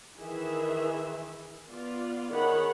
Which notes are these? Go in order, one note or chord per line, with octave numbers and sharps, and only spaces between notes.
D#3 E3 G#4 E5
B3 F4 D5
D#3 G#4 A#4 C#5 F#5 B5